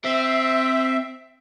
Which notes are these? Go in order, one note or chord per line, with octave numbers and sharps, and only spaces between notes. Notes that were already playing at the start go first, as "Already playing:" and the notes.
C4 E5